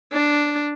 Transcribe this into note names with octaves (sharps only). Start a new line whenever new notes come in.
D4